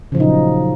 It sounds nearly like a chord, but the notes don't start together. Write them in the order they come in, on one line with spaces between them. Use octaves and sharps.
C#3 F3 A#2 D#4 F#3